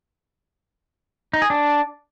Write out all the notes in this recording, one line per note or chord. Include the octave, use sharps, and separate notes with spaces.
D#4
G#4
D4